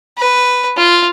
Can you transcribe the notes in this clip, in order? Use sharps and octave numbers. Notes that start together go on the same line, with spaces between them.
B4
F4